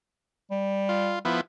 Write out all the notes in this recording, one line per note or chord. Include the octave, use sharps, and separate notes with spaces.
G3
F4
F3 B3 E4